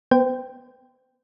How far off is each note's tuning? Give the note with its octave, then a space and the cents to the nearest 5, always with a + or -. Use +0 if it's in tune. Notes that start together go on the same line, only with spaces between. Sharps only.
B3 +0 C5 -35 G5 +0